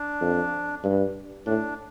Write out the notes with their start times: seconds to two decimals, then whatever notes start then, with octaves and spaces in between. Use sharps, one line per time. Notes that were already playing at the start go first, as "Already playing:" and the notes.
Already playing: D4
0.22 F2
0.84 G2
1.46 A2 D4